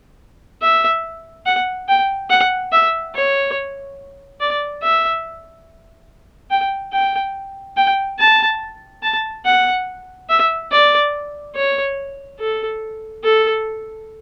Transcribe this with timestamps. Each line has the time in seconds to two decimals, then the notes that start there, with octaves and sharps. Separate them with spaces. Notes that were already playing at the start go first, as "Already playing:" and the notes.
0.61 E5
1.45 F#5
1.88 G5
2.30 F#5
2.72 E5
3.15 C#5
4.40 D5
4.82 E5
6.50 G5
6.92 G5
7.77 G5
8.19 A5
9.03 A5
9.45 F#5
10.29 E5
10.72 D5
11.55 C#5
12.39 A4
13.24 A4